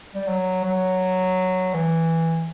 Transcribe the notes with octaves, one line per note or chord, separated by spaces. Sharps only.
G3
F#3
F#3
E3